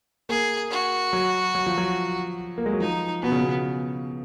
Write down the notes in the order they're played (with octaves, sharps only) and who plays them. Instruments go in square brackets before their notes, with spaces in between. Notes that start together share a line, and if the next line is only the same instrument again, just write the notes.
[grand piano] A#3 [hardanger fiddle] G#4
[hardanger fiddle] F#4
[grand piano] F#3
F#3
F3
F#3
A#3
G#3
F#3
[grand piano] F3 [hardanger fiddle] D#4
[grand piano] B2 [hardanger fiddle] B3
[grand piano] C#3
B2